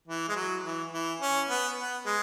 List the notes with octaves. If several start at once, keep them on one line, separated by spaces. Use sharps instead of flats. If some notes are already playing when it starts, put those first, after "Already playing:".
E3
G#3
F#3
E3
E3
C#4
B3
B3
G#3